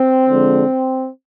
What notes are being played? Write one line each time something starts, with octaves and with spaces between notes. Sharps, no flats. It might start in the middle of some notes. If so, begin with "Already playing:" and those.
Already playing: C4
D3 F3 G#3